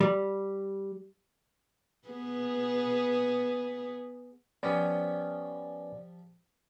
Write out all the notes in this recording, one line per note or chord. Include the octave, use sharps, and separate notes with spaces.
G3
B3 G#4 B4
F3 G3 B3 C#4 D5